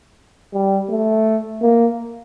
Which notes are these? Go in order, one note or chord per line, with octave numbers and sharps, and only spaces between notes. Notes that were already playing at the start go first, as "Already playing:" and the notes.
G3
A3
A#3